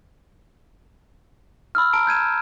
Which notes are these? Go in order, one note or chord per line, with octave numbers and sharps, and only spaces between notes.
B5 E6 F6
A5 A#5 D7
G6 G#6 D#7 E7
F#6